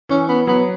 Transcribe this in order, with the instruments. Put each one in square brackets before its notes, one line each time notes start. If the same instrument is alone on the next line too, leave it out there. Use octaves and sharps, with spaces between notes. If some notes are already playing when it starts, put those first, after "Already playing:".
[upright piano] E3 [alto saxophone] C#4
[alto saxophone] B3
[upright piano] F#3 [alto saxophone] B3